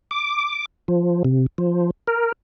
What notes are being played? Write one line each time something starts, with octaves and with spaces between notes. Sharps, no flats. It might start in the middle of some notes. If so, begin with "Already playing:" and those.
D6
F3
C3
F3
A#4